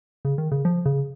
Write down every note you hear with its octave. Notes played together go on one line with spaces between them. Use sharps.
C#3
D#3
C#3
F3
C#3